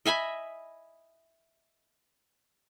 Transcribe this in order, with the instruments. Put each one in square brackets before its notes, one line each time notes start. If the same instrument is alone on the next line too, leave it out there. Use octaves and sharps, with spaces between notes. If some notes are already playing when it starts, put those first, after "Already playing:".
[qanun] D#5 E5 G#5 B5